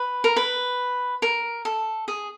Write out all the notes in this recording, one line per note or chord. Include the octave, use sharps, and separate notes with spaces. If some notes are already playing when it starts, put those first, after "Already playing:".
Already playing: B4
A#4
B4
A#4
A4
G#4